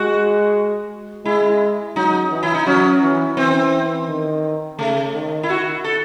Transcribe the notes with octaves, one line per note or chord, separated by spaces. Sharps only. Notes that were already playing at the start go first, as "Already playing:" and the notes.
Already playing: G#3 F#4
G#3 E4
F#3 D#4
E3
E4
D#4
F#3 C#4
E3
E3 C4
D#3
C#3 A3
D#3
E4
D#3 F#4
A4